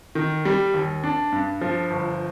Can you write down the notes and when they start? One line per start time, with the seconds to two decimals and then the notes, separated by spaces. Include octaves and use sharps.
0.15 D#3
0.45 G3
0.74 D#2
1.03 D4
1.32 G2
1.61 F3
1.91 G1